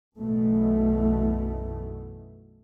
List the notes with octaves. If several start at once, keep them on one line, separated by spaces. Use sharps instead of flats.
B1 F#2 B2 E3 A3